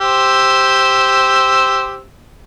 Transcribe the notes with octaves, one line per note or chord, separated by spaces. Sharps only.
G4 C5 E6